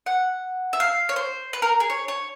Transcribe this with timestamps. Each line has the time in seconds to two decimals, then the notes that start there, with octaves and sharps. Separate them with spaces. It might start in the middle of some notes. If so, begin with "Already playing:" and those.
0.06 F#5
0.73 E5
0.80 F5
1.09 C#5
1.16 C5
1.53 B4
1.62 A#4
1.80 G#4
1.90 C#5
2.08 C#5